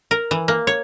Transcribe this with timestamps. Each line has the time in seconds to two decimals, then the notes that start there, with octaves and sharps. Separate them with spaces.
0.11 A#4
0.31 E3
0.48 A#3
0.67 C#5